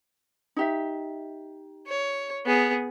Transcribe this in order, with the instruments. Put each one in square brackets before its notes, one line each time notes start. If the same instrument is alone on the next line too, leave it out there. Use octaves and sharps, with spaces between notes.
[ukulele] D#4 G4 E5
[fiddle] C#5
B3 G#4